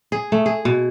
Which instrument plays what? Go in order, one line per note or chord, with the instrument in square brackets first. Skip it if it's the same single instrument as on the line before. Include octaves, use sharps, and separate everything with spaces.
[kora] G#4
A3
G#4
B2